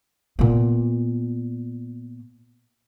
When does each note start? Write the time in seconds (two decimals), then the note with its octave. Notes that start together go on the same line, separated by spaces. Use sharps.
0.39 A#2 B3